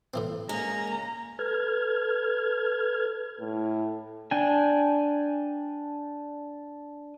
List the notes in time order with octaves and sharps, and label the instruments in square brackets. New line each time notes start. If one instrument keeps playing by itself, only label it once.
[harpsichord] A2 E3 C4
[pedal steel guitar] G#3 A#3 [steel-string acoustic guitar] C#4 [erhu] A#5
[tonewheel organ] A4 B4 F6 G#6
[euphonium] A2
[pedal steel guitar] D4 G5 G#5